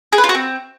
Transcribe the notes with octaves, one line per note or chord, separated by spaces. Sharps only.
G#4
B4
F4
F#4
C4